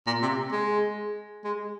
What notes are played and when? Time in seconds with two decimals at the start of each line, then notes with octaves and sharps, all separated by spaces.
0.07 A#2
0.22 C3
0.52 G#3
1.44 G#3